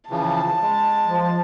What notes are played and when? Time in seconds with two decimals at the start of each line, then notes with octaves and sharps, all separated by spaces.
0.10 C#3 E3 F3 A5
0.62 G#3
1.07 F3